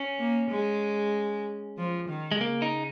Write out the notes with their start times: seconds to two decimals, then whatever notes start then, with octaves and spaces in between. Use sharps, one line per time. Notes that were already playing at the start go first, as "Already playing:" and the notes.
Already playing: C#4
0.19 A#3
0.51 G#3
1.78 F3
2.09 D#3
2.32 G#3
2.41 C#3 A#3
2.62 D#4